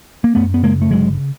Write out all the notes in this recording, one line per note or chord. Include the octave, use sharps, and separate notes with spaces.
A#3
F#2 A3 B3
B3
C#3 G#3 A#3
A3
G1 F#3 G#3